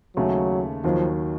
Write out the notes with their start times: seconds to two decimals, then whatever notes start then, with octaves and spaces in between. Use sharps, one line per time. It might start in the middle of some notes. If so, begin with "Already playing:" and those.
0.16 D#2 C#3 F#3 A3
0.84 D#2 D#3 F3 F#3